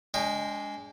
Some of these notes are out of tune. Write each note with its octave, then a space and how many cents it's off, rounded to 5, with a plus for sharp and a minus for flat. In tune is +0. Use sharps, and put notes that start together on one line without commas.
G#3 +0 D4 -35 G5 +30